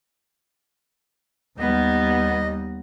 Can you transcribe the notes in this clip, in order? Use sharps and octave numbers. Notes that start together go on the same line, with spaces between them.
D#2 G3 B3 D#5